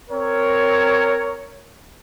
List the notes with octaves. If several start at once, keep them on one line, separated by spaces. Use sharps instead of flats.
C4 A#4 C#5